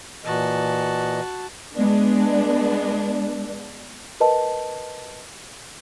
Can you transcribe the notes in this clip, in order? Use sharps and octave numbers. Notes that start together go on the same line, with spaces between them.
A#2 E3 F#4 D#5 A5
G#3 B3 D4
A#4 B4 D#5 A5